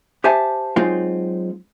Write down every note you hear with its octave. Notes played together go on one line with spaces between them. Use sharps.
G4 C5 E5 G#5 A5
F#3 G#3 C4 D#4 F4